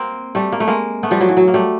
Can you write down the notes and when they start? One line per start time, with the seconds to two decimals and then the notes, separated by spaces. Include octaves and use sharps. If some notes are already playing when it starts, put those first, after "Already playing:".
Already playing: A#3 C4
0.35 G3 A3
0.52 A#3
0.60 A3
0.67 G#3 A#3
1.03 A3 B3
1.11 F3 G3
1.20 F#3
1.29 E3
1.37 F#3
1.48 A#3
1.54 G3 A3